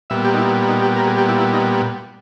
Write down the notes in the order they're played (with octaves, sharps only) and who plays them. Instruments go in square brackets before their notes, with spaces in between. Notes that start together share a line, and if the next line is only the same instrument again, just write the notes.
[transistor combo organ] A#2 G3 B3 E5
G4
D#4
E4
D#4
G4
A#4
G#4
G4
E4
E4
D#4